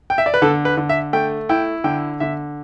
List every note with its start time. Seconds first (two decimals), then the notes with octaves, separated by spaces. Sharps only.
0.10 G5
0.18 E5
0.26 D5
0.34 B4
0.42 D3 A4
0.65 B4
0.77 D3
0.89 E5
1.13 A3 G5
1.49 E4 G5
1.84 D3 G5
2.20 D3 E5